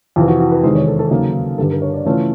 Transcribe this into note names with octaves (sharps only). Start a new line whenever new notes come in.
F2 C3 E3 F4
F#4
F#4
B4
E2 C3 D#3 G#3 C5
C#5
A4
A4
D#2 C#3 F#3 A#3
G2 D3 G3 A4
A#4
C#5
D5
C#3 E3 A3 C#4 F4 C#5